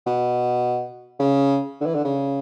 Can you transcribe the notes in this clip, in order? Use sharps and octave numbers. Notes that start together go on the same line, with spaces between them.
B2
C#3
D3
E3
D3
C#3